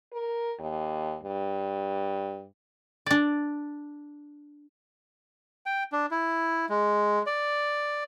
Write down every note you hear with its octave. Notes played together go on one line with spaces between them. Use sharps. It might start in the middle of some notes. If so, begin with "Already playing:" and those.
A#4
D#2
G2
D4 D5
G5
D4
E4
G#3
D5